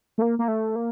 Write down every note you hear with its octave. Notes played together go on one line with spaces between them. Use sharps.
A3
A#3
A#3
A3
A#3